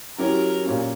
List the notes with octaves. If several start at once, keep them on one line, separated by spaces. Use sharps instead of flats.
F#3 C#4 E4 G4 A#4
A#2 A#3 C#4